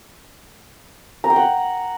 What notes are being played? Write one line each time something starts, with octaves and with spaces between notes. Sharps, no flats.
A#5
G5
F#5
A#5